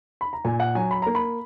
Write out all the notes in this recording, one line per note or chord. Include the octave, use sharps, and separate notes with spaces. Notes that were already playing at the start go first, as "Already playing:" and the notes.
B5
A#5
A#2 G#5
F#5
F#3 G#5
B5
A#3 A#5
B5